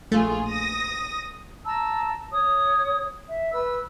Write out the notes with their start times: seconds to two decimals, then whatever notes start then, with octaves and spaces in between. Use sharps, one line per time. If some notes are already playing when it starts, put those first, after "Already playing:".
0.12 A#1 A3 F4 G#4
0.47 D#6 A#6
1.65 A5 A#5 E6
2.32 C#5 D#6
3.29 E5
3.53 B4 E6